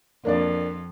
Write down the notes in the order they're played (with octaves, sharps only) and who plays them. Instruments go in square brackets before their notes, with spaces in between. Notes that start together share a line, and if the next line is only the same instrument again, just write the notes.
[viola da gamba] F2 [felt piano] A#3 D4 D5